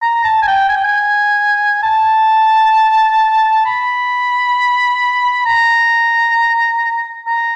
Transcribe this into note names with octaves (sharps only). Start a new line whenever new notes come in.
A#5
A5
G#5
G5
G#5
G5
G#5
A5
B5
A#5
A#5